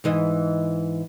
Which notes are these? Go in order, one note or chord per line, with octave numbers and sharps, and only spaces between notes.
G#2 E3 D#5